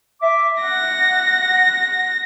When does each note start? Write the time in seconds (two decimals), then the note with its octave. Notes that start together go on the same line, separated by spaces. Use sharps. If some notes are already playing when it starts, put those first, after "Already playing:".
0.22 E5 D6
0.64 F#5 A#6